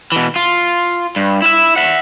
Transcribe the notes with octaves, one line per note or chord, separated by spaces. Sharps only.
B2 E3
F4
G2
E4 E5
E5 F#5